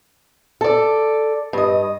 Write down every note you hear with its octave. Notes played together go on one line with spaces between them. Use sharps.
A4 D5
G2 D#5